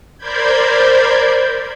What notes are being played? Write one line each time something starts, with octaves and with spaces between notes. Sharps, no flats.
A#4 C5 D5 B5 G6 G#6